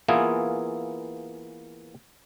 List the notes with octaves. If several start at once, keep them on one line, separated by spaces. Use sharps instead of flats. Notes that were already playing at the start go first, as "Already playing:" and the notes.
E3 A#3 B3 E4 F4 G#4